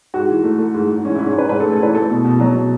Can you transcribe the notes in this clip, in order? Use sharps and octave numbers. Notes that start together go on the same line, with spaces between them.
G#2 F#4
E3
A3
A3
G#2
G#2
E3 C#4
E4
G#2
C#4
G#2 B4
G#2 B4
A4
A3
A4
E3 B4
A3 A4
B2
B2
F#3
B2